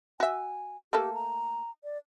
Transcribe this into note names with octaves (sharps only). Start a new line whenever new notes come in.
F#4 E5 G#5
A3 A#3 G4 A4
A#5
D5